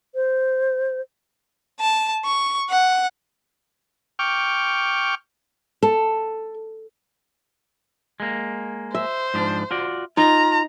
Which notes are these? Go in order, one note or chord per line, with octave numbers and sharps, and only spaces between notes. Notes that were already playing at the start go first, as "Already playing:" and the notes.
C5
A5
C#6
F#5
G5 C#6 D6 F6
A4
G#3 A#3
C5 E5
G#2 F3 D4
F4 F#4 D5
D#4 F4 A#5